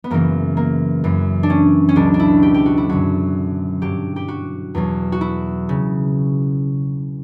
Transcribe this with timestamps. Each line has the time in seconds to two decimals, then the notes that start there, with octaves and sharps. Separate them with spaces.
0.04 B3
0.10 F#2 C#3 E3 A#3
0.57 A#3
1.04 F#2 E3
1.43 D4
1.50 C#4
1.89 C#4
1.96 C#2 B2 F#3 D4
2.14 D4
2.20 E4
2.43 G4
2.54 G4
2.66 F#4
2.78 E4
2.89 F#2 D3 F#3 F#4
3.82 G2 F#3 G4
4.16 G4
4.28 F#4
4.75 E2 B2 F#3
5.12 F#4
5.21 E4
5.69 C#3